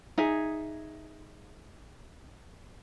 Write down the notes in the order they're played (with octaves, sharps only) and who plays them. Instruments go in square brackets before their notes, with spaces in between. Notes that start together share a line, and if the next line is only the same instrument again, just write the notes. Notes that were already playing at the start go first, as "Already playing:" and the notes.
[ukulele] D#4 G#4 E5